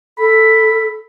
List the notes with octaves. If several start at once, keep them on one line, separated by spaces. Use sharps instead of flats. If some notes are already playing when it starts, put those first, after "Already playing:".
A4 B5